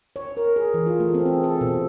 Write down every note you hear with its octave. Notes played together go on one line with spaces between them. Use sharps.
C#5
A#4
G#4
E3
F4
A3
C4
G#4
A4
B2